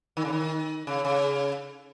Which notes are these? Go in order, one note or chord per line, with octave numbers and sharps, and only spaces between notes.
D#3
C#3
D#3
C#3
C#3